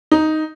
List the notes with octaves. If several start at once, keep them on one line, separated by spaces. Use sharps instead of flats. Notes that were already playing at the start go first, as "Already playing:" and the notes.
D#4